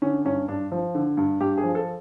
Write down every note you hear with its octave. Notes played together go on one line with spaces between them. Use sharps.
D3 C#4
G2 C#4
G2 D4
F3
D3
G2
G2 G4
G#4
F3
A4